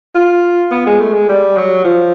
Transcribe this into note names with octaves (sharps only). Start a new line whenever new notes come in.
F4
B3
G#3
A3
G#3
G3
F#3
F3